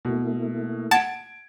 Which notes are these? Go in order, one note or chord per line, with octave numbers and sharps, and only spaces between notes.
B2 A3 A#3 E4
F#5 A5 G#6 D7